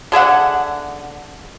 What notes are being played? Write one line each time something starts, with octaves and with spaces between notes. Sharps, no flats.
D3 G#4 E5 F#5